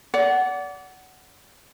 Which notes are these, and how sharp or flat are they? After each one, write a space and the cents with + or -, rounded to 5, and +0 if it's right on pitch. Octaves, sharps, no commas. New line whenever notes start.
D5 -30 F#5 +10